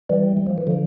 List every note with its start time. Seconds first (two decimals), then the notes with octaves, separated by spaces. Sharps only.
0.09 E3 G3
0.37 G3
0.47 F3
0.58 E3
0.67 D3 F3